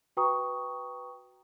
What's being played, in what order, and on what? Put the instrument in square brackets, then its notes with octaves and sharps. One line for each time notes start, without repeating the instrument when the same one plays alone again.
[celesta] F#4 B4 G5 A#5 C#6 D#6